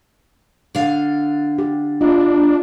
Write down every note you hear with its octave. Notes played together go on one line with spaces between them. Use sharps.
D3 F5
G4
D4 F4 D#5